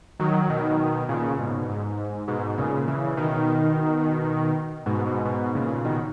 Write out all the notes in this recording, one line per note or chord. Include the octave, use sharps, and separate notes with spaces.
D#3 F#3
B2 D#3
A#2 C#3
G#2 B2
G#2
G#2 B2
A#2 C#3
C#3 E3
B2 D#3
G#2 B2
G#2 B2
G#2 B2
A#2 C#3
B2 D#3